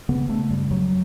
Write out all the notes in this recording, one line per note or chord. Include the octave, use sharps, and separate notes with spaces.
C#3 B3
C#3 A3
F#2 G3
F#2 F#3